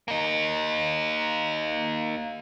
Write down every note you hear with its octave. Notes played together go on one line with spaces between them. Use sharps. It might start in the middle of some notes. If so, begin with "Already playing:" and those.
A#3 D#4